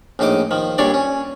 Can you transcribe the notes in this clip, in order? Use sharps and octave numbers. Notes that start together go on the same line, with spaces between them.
A#1 A2 D#4 D#5 D6
D#3 F3
G2 A#2 D4 C#5 D5
C#4